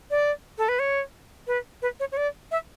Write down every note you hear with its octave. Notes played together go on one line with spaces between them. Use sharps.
D5
A4
B4
C#5
B4
B4
C#5
C#5
D5
E5